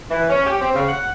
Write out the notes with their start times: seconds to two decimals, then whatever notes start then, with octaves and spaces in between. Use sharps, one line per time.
0.10 E3
0.29 C#4
0.46 G4
0.61 C4
0.75 C#3
0.88 F#5